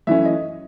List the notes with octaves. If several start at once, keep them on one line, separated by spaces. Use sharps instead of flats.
F#2 E3 A3 C#4 E5
D#5